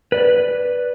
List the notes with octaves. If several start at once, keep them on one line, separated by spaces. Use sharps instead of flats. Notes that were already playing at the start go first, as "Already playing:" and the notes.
B4 D5